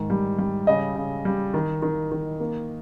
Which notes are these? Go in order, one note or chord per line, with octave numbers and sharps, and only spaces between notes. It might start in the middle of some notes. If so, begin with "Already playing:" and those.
Already playing: G#2 D#3
G3
G3
C#3 D#5
C#3
G3
D#3
D#3
D#3
A#3